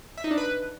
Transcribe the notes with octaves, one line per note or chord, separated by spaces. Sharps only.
E5
D#4
D4
B4